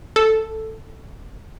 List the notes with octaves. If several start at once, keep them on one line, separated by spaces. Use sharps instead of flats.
A4